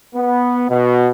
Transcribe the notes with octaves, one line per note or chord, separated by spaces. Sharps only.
B3
B2